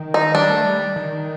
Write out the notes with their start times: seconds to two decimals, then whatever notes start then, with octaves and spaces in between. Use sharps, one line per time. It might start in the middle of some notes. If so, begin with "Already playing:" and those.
Already playing: D#3
0.14 D#4
0.34 G3 D4
0.50 A3
0.65 G3
0.96 D#3